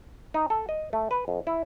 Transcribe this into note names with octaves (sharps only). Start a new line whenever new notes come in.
D#4
A4
D#5
A3
B4
F2
E4